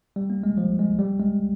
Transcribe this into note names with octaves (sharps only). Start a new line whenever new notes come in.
G3
A#3
G#3
F3
G#3
G3
G#3